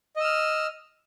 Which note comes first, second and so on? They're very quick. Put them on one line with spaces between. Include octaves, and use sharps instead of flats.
D#5 E6 F6